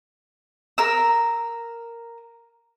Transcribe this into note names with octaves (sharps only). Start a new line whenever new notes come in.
A#4 E6